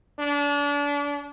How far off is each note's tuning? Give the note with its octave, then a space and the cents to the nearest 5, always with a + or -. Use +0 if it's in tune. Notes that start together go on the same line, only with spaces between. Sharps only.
D4 -35